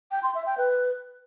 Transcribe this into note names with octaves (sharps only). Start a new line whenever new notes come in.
G5
C6
E5
G5
B4